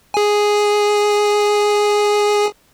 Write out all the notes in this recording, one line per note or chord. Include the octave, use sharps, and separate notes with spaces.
G#4 G#5